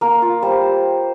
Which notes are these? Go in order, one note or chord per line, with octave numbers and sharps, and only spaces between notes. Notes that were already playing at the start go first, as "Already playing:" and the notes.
A#3 A#4
F4
G3 C5